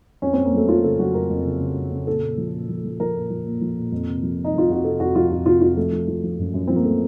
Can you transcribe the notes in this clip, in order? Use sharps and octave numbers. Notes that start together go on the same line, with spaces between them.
F2 C#4
F2 C4
A#3
F#3 A3
F#3 F4
C#3 A4
F#3 F#4
F2 A#4
F2
C#3
C#3
F2
C#3
A#2 A4
A#2
F3
A#2
F3
F3
F3 A#4
A#2
F3
A#2
F3
A#2
F2
C3
F3
C3
D#4
F2 F4
F2 F#4
C3 A4
F2 F#4
F3 F4
F2 F#4
C3 F4
F2 F4
F3 A3
F3
F3
F3
F#2
F#2
F3 C4
A#3
F3 A3